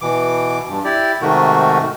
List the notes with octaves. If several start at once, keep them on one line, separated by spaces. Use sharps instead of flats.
B2 E3 D6
G2
E4 G4 D5
G#2 C3 D#3 A3 F#4